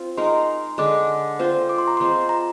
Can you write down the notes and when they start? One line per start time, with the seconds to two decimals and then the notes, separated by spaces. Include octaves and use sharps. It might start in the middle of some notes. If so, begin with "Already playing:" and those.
Already playing: C4 F4
0.17 G#3 D#4 A#4 C6
0.78 D3 G#3 D4 D6
1.39 C4 F4 C5
1.69 D6
1.78 C6
1.88 A#5
1.97 G#3 C4 F4 C5 C6
2.29 A#5